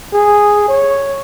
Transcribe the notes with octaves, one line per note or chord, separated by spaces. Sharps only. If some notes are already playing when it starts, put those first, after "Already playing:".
G#4
C#5